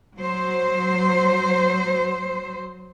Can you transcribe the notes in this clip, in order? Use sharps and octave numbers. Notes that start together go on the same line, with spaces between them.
F#3 C5